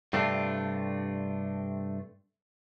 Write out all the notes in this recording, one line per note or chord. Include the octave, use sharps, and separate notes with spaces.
G2 C3 A3 C4 D4 F4